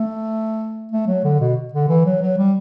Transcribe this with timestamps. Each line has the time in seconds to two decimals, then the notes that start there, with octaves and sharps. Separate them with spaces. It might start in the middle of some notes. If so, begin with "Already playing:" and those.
Already playing: A3
0.92 A3
1.07 F#3
1.24 D3
1.40 B2
1.73 D3
1.88 E3
2.05 F#3
2.22 F#3
2.38 G3